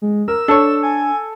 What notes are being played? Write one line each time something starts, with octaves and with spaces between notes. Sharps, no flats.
G#3
A#4 E6
D4 A4 C#5
G#5